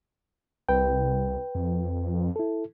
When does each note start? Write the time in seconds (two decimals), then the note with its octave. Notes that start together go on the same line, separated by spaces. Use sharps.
0.69 C2 B4 G5
1.55 F2
2.36 E4 A4